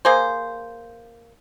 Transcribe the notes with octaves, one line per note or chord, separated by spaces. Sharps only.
A#3 G#4 C5